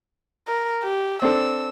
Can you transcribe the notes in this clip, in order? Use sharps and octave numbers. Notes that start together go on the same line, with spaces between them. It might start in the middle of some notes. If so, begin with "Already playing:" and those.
A#4
G4
C4 D4 A4 E6